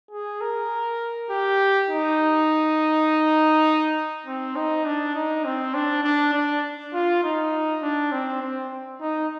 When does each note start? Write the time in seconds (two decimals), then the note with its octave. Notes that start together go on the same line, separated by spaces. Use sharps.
0.11 G#4
0.41 A#4
1.30 G4
1.90 D#4
4.26 C4
4.56 D#4
4.85 D4
5.16 D#4
5.45 C4
5.74 D4
6.04 D4
6.34 D4
6.94 F4
7.23 D#4
7.82 D4
8.12 C4
8.42 C4
9.01 D#4